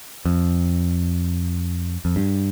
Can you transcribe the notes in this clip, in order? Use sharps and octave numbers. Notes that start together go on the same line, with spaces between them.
F2
F2
G2